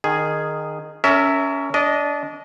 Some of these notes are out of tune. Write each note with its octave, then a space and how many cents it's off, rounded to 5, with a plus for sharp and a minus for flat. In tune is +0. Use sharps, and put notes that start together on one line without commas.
D#3 -15 G#4 +0
C#4 +20 A#4 -25 E5 -5
D4 -25 D#5 +0